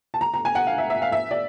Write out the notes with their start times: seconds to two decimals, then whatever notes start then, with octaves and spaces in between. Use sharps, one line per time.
0.14 A5
0.21 A#5
0.34 A#5
0.45 G#5
0.55 F#5
0.67 F5
0.78 E5
0.90 E5
1.02 F5
1.12 E5
1.31 D5